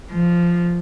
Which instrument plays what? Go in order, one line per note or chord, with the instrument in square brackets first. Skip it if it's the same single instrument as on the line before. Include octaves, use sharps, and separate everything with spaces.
[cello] F3